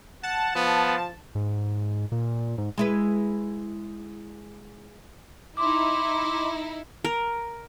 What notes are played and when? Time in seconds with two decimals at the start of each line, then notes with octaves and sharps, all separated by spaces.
0.23 F#5 A5
0.55 F3 B3
1.35 G#2
2.12 A#2
2.58 G#2
2.78 G#3 E4 B4
5.57 D#4 E4 C6 D6
7.05 A#4